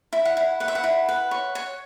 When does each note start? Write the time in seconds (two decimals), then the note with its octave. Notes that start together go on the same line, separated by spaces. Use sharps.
0.13 E4
0.25 F#5
0.37 E4
0.60 B4 F#5
0.68 E5
0.75 F#5
0.84 E4
1.09 B4
1.31 C#5
1.55 C#5